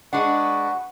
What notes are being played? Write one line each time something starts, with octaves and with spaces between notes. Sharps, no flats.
G#3 D4 F#4 B4 F#5